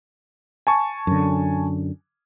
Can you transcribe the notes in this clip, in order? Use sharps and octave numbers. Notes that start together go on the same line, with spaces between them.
G#5 A5 C#6
F#2 D3